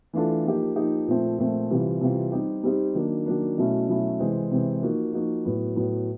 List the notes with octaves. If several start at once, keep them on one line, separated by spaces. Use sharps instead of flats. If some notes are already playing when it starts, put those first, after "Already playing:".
E3 A3 D4 F4 A4
F3 A#3 D#4 G4
F3 A#3 D#4 G4
A#2 F3 A3 C4
A#2 F3 A3 C4
C3 E3 G3 C4 F4
C3 E3 G3 C4 F4
G3 C4 D#4 G4
G3 C4 D#4 G4
D#3 F#3 A#3 D4
D#3 F#3 A#3 D4
B2 F#3 A3 C#4 E4
B2 F#3 A3 C#4 E4
C3 E3 G#3 C4
C3 E3 G#3 C4
F3 A#3 D#4 F#4
F3 A#3 D#4 F#4
A2 F#3 B3
A2 F#3 B3